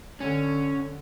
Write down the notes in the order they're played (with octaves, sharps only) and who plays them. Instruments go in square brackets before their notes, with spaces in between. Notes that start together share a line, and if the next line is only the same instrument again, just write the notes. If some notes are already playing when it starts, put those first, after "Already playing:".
[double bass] D3 [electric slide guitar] C#4